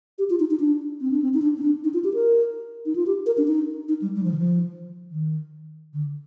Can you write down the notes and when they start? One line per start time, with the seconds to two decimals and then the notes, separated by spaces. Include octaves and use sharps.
0.19 G4
0.30 F4
0.40 D#4
0.51 D#4
0.60 D4
1.01 C4
1.11 D4
1.22 C4
1.34 D#4
1.42 D4
1.58 C4
1.62 D4
1.84 D#4
1.94 F4
2.04 G4
2.14 A#4
2.86 D#4
2.96 F4
3.07 G4
3.26 A#4
3.38 D4
3.48 D#4
3.88 D#4
4.02 G3
4.16 G3
4.23 F3
4.31 D#3
4.38 F3
5.11 D#3
5.93 D3